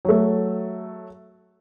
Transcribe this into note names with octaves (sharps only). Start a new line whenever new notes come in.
F#3 A3